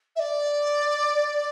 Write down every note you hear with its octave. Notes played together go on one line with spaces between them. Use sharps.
E5
D5